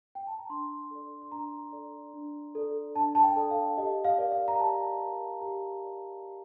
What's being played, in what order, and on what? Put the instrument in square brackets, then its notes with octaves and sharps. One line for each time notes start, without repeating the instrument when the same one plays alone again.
[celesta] G5
A5
A#5
D4 C6
A4 D5
C6
D4 A#5
A4 D5
D4
A4 D5
D4 A5
A5
G5
A4 D5
F5
G4 D#5
F5
A#4 D5
F5
A#5
G4 A5
A#4 D5
G4 A#5
A#4 D5
G4